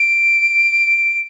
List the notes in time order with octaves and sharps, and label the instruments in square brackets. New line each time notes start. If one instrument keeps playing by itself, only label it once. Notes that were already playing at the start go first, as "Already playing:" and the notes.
Already playing: [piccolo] D7